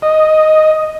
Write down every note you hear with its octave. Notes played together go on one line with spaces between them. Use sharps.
D#5